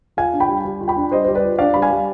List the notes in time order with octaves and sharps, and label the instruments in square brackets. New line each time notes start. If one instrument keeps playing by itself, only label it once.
[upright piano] F4 F5 G#5
D4
G5 B5
G3
G3
F4
G5 B5
D4
G3 C5 D#5
G3 C5
B4 D5
F4
D4 D5 F5
G3 B5
F5 G#5
G3